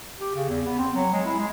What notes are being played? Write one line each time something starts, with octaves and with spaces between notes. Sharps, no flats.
G4
C#3
E2
B3
C4
F#3
G#3
E4
G#3